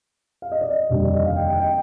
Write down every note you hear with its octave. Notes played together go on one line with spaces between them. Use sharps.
F5
D#5
D5
D#5
F1 D#2 D3 G3
D5
D#5
F5
D#5 G5
D#5 G5
D#5 G5